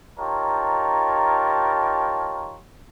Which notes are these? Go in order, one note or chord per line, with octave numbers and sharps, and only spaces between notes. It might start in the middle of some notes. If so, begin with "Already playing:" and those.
D#4 F4 G4 A#4 C#5 A5